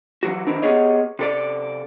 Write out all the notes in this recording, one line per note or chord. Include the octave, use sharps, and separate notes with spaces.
E3 F#3 F#4
D#3 E3 C4 D4 D#4
B3 G4 G#4 C#5 D#5
C3 A4 D5